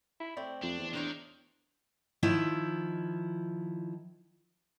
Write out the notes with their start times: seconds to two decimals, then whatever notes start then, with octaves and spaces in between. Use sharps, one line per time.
0.20 E4
0.37 A3 C4 D5
0.63 F2 D4
0.79 E2
0.93 D#3 D4 A#4 C5 C#5
2.23 D#3 F3 E4